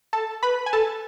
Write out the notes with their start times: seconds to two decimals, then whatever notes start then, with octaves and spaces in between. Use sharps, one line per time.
0.13 A4 A5
0.43 B4 B5
0.66 G#5
0.73 A4 A5